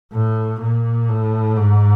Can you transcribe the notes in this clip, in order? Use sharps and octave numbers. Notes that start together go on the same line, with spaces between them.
A2
A#2
A2
G#2